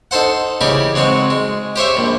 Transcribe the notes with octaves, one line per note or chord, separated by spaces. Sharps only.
D#4 A4 C5 F#5
C#3 E3 D#4 G4 G#5
F#3 G#3 C4 C#5
G#3
G4 C5 C#5 E5
A#1